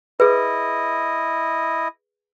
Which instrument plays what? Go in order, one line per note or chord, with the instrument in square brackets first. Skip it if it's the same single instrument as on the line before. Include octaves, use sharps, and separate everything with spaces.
[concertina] E4 D#5 [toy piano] G#4 B4